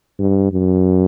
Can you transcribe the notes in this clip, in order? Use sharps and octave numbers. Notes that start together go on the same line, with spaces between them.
G2
F#2